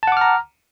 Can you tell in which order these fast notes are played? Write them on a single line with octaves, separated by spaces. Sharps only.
A5 F#5 D6 F6 A#5